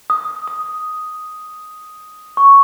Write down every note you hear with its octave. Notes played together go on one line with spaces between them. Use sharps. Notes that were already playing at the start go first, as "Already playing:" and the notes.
D#6
D#6
C#6